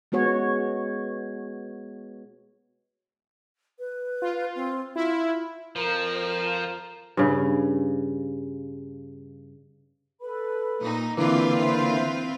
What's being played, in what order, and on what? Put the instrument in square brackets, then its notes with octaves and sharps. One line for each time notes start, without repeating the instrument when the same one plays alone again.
[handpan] G#3 B3 F#4 C#5
[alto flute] B4
[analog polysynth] F4
[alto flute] C4
[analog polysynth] E4 [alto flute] F4
[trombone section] F2 A#4 [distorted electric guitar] F3
[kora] G2 C#3
[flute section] A4 B4 B5
[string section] A#2 D#4
[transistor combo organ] D3 A#3 [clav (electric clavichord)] E3 [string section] C4 F4 B4 [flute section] E4 D6
[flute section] C5 E5 C6